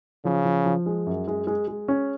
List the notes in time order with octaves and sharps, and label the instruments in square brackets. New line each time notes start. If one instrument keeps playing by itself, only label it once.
[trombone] C#3 [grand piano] F3
[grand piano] F3
F3
G#3
F#2
G#3
G#3
G#3
C#4